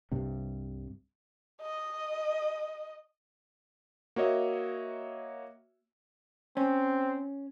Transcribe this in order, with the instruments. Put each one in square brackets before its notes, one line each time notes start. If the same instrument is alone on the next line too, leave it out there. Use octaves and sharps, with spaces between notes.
[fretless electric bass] C2 G2 C3
[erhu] D#5
[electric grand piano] A#3 F#4 C#5 D#5 E5
[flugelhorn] C4 [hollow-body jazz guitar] C#4